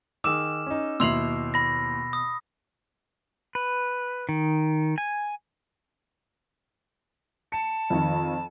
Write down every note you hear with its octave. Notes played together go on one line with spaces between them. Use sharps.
D#3 G#4 D6 E6 F6 E7
C#4 D#4
D#2 B2 E4 C6 E6 C7 F7 F#7
B5 A#6
D#6
B4
D#3
G#5
A5 C#7
F2 D#3